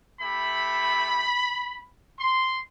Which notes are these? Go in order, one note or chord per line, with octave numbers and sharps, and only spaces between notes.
A3 E4 G4 B5
C6